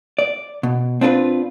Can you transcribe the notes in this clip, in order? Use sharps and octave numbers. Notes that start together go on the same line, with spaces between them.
D5
B2
C4 D4 F4 A#4 B4